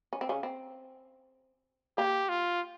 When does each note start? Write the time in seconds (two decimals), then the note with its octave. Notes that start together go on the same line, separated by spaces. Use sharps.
0.13 C#4
0.21 C4
0.29 C#3 C#4
0.43 C4
1.98 A#3 G4
2.29 F4